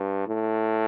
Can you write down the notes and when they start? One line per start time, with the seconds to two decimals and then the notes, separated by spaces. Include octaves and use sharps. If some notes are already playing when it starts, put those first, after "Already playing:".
Already playing: G2
0.27 A2